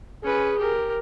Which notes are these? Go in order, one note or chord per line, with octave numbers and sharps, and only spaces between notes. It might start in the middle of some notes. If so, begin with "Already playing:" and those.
C#4 G#4 B4
G4 A#4